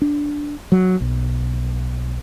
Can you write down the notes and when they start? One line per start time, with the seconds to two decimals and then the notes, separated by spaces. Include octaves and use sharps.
0.02 D4
0.72 F#3
1.00 B1